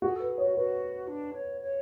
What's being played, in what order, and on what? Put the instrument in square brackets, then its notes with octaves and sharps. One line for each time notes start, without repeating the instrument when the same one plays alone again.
[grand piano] F#4 [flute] G#4
[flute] A4 [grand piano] B4
[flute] G#4
[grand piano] C#5
[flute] F#4
[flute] F#4 [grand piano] B4
[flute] D4
C#5
C#5